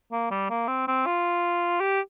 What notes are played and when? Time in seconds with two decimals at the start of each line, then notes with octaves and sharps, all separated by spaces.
0.12 A#3
0.31 G3
0.50 A#3
0.68 C4
0.88 C4
1.06 F4
1.81 G4